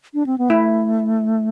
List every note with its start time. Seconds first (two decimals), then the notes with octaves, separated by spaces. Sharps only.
0.14 D4
0.26 C4
0.38 B3
0.50 A3 E4